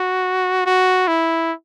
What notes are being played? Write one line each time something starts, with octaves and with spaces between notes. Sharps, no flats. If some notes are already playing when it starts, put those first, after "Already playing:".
Already playing: F#4
F#4
E4